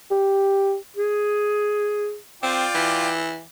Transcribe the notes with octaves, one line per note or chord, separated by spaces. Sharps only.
G4
G#4
C4 F4 D5 G5
E3